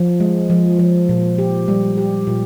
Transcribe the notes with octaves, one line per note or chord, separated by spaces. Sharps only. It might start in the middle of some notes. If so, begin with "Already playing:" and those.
Already playing: F3
G#3
F3
F3
A#2
G4
G3
G4
A#2